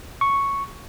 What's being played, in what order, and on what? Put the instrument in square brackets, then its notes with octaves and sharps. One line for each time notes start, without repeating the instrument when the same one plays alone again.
[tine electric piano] C#6